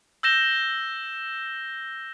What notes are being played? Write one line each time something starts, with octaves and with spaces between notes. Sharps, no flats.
E6 G6 A#6 E7 G7